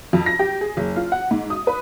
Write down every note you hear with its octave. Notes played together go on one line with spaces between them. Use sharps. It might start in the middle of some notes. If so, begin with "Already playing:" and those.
F2
A#6
G4
G#4
F#1
F4
F#5
G#2
D#6
B4